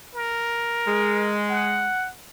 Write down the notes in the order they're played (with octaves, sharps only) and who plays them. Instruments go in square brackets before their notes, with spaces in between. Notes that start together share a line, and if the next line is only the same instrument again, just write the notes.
[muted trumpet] A#4
[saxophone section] G#3
[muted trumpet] F#5